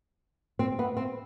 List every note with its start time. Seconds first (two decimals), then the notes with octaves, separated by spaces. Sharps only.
0.59 C4
0.79 B3
0.97 C4